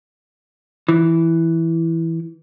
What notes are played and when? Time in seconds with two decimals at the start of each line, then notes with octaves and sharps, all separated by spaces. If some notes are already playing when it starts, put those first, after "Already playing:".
0.88 E3